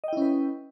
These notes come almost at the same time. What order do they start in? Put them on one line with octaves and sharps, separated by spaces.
D#5 G5 E4 C#4 B4